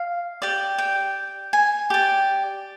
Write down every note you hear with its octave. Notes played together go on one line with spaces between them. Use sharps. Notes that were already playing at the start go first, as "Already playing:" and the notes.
Already playing: F5
G4 D5
G5
G#5
G4 D5